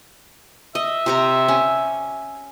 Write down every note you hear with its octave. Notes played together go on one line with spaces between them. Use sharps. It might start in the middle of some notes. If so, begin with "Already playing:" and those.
D#5 E5
C3 G4 A#5
C#4